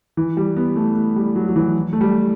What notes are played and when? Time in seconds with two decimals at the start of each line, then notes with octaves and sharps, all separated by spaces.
0.17 E3
0.37 G3
0.56 B3
0.76 A3
0.96 A3
1.16 G3
1.35 F#3
1.49 F#3
1.56 E3
1.93 A3
2.01 G3